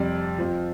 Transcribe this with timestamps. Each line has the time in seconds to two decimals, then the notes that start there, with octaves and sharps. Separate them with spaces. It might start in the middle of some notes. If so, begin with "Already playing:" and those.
Already playing: F2 C3 G3 D5
0.38 F2 F3 C5